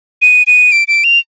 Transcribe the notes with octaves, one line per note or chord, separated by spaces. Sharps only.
D#7
D#7
D7
D7
F7